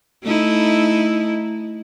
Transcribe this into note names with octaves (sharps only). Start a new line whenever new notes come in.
A3 D#4 E4